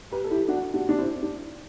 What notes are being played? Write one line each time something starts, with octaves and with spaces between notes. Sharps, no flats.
G4 B4
A4
E4 G4
D4 F#4
D4 F#4
D4
C4 E4
D4